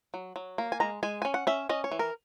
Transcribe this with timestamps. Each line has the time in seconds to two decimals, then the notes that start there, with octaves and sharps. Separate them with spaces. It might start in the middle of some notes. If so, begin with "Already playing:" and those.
0.14 F#3
0.36 F#3
0.58 A#3
0.72 G#5
0.80 G#3 A#5
1.03 G#3 G#5
1.22 C#4 G#5
1.34 F#5
1.47 C#4 E5
1.69 C#4 D#5
1.84 C#5
1.92 E3
1.99 A#4